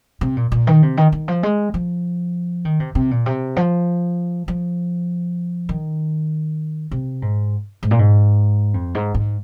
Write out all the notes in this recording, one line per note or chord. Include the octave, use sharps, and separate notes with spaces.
C3
A#2
A#2
D#3
C3
D#3
D#3
F3
G#3
F3
D#3
C3
C3
A#2
C3
F3
F3
D#3
C3
G#2
G#2
A#2
G#2
F2
G#2
G#2